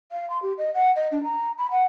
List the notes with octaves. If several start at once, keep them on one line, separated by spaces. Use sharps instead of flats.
F5
C6
G4
D#5
F#5
D#5
D4
A#5
B5
F#5